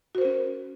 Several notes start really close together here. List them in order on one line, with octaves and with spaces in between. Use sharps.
F#4 C5 A#4 C#4